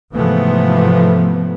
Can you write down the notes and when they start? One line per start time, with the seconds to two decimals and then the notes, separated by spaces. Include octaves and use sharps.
0.14 G#2 C3 E3 F3 A3 B3